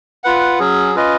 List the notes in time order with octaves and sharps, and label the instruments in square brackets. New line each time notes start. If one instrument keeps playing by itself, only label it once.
[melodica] F4 B4 F#5
F#3 C#4 G#4
C#4 F4 B4 D#5